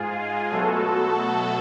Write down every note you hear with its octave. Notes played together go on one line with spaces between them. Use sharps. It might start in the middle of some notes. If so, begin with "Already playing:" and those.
Already playing: G#2 G#3 F4 G#4
B2 F#3 A3 F#4 A4